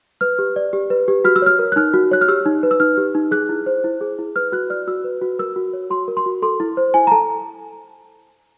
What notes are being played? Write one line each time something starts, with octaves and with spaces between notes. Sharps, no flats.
B4 F6
G4
D5
G4
B4
G4
F#4 F6
E6
C#5 F6
A#4
F#6
D#4 F6
F#4
C#5 F#6
F6
G4 E6
D#4
B4
E6
D#4 F6
G4
D#4
G#4 F#6
E4
C5
E4
G#4
E4
B4 F6
F#4 F#6
D5 F6
F#4 E6
B4
F#4
A#4 E6
F#4
C#5
F#4 C6
A#4
C6
F#4
A4 C6
E4
C5
E4 G#5
A#5
A4 A5